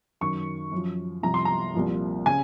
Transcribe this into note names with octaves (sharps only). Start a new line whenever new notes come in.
F#2 D#3 C#6
F#2 F3
C2 C3 F3 A#5
C6
A#5
C2 A#2 F3
C#3 G#5